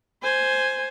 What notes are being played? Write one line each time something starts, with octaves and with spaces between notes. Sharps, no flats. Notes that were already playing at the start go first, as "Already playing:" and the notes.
C5 G#5